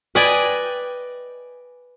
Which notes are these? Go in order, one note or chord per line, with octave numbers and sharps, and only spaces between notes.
B4 D5 D#5 G5 G#5